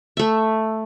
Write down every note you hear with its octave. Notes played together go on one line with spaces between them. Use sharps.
A3 E5